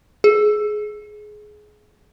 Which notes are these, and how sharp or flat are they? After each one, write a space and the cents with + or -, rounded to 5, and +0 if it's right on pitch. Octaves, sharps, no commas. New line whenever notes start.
G#4 +20